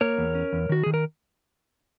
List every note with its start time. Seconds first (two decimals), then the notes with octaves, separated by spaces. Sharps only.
0.01 A#3 A#4 C#5
0.18 E2
0.35 C#4
0.53 E2
0.69 D#3 F#4
0.83 D#3 G#4
0.94 A#4